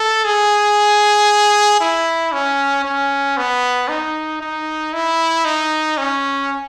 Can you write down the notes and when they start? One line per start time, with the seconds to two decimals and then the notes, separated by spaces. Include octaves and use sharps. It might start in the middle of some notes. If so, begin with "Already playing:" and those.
Already playing: A4
0.25 G#4
1.81 E4
2.32 C#4
2.85 C#4
3.37 B3
3.89 D#4
4.41 D#4
4.93 E4
5.45 D#4
5.98 C#4